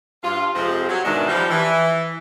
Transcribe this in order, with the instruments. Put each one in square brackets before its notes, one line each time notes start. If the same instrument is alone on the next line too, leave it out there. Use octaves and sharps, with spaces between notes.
[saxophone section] G2 F4
F2 C3 F3 G#3 C4
F#3
G#2 B2 D#3 E3 G#3 D4
F3 G3
E3